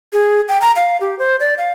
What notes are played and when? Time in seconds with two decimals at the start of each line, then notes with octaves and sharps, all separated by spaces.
0.13 G#4
0.48 G5
0.61 A#5
0.76 F5
1.01 G4
1.19 C5
1.40 D5
1.58 F5